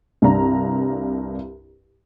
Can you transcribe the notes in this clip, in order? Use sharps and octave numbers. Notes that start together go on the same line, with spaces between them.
C2 G2 D4 A#5